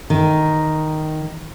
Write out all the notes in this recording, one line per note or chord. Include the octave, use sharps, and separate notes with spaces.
D#3